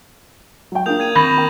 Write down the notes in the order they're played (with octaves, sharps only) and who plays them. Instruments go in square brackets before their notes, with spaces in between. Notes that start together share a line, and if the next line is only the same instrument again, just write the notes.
[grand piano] F#3 G5
[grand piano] A#3 [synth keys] D4 F4 G#4 [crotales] D#6 G6 F7
[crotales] G#6 D#7
[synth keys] D#3 C4 [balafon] B5 [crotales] C#6 A#6 F#7
[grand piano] A#4 G5 A#5